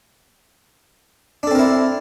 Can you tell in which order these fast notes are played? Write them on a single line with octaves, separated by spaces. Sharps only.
D4 A4 C4 A#4 E4